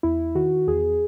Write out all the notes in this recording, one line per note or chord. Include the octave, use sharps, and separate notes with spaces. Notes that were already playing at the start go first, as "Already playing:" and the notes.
E2 E4
D#3 F#4
E2 G#4